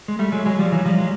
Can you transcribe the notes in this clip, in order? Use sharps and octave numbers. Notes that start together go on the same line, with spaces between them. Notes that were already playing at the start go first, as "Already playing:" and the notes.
G#3
G3 A3
F#3 G#3
F#3 G#3
F3 G3
E3 F#3
F3 G3
F#3 G#3